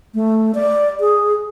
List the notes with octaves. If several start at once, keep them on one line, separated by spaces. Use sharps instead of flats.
A3
D5
G#4